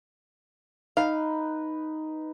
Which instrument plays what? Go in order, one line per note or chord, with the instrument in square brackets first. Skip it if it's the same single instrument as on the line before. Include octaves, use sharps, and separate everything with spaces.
[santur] D#4 B4 [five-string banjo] F5